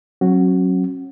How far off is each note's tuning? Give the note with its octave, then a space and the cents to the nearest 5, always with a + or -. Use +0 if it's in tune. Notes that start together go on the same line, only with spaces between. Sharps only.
F#3 +5 C#4 -35 F#4 +0